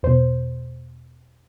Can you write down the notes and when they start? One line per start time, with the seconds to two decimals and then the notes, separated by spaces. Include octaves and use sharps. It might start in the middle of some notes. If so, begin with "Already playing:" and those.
0.03 E2 B2 C5